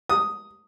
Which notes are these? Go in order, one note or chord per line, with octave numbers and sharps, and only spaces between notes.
D#6